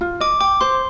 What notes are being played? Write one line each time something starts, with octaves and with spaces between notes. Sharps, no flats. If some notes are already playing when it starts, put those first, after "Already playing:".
F4
D#5 D6
G5 D6
C5 C6